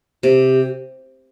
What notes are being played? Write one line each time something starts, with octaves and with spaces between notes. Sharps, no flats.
C3 G4